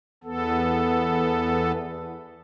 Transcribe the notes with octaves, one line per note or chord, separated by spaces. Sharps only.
E2 B3 A4